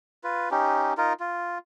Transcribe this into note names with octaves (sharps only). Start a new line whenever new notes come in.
F4 B4
C#4 D#4 G4
D#4 F4 A#4
F4